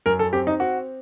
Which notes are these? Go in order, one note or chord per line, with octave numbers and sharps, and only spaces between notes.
F#2 A#4
A4
C4 G4
D#4
C4 F#4